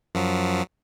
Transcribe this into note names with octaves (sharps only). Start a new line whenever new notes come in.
F#2 F3 F#3